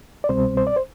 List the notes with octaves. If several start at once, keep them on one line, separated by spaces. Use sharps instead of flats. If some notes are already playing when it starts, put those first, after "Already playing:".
D5
C2 B2 G3 C4 C5
C5
D5
C5